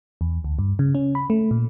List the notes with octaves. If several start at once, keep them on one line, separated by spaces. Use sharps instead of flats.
E2
D2
G2
C#3
C#4
B5
A3
A#2